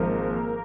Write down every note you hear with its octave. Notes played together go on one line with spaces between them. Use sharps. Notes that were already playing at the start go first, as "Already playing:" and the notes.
Already playing: G#1 G#2 F3 A#3 A#4